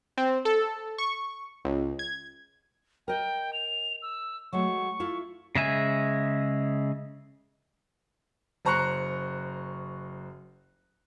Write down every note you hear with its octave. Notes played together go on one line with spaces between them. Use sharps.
C4
A4
C#6
C#2
G#6
A#4 D#5 G5
F7
E6
F#3 G#3 A3 C#6
E4 F4 A4
C#3 G#3 E5 G#5
F#1 C5 A#5 C#6 F#6 C#7